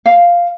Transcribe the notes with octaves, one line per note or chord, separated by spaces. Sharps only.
F5